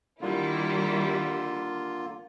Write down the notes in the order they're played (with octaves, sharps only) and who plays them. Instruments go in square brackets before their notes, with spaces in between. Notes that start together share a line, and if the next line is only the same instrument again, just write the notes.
[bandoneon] D3 A#3 F4 [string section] D#3 G3 E4